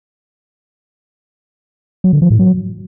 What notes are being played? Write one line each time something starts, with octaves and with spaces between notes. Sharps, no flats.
F#3
D3
F3
A2
F#3